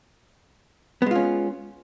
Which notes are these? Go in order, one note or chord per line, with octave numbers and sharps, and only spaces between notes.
G#3 B3 C#4 F4